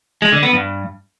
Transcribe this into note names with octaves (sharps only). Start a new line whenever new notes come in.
G#3
D3
B3
G2